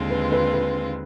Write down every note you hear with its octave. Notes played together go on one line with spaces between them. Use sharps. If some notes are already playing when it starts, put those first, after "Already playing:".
Already playing: D#2 D3 G#3 C4 F4
B4
B4
B4